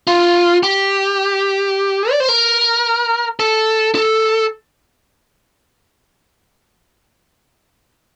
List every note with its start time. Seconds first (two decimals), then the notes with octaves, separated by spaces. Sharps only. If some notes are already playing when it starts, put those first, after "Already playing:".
0.07 F4
0.63 G4
2.11 D5
2.20 C5
2.29 A#4
3.40 A4
3.95 A4